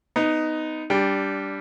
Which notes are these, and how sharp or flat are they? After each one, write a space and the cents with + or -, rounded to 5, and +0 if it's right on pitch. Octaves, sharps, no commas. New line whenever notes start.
B3 +25 D#4 +0
G3 +0 D4 -15 G5 +5